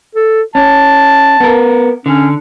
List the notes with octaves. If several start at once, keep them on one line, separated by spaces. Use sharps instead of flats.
A4
C#4 A5
B3 A#4
D3 C#4